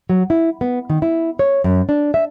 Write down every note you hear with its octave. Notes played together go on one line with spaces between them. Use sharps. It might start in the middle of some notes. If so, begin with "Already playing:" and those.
F#3
E4
B3
D#3
E4
C#5
F#2
D4
E5